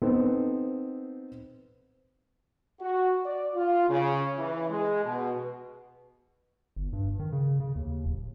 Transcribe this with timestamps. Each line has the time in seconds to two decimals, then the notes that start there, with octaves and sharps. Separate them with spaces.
0.02 B3 C4 D#4 A4
2.81 F#4
3.24 D5
3.54 F4
3.89 C#3
4.38 E3
4.69 G#3
5.04 B2
6.76 G1
6.93 G2
7.19 D#3
7.32 C#3
7.60 C#3
7.76 D#2
8.05 D1